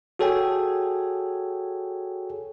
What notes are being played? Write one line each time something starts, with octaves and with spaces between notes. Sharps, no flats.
F#4 G#4 A4 C#5 G5 G#5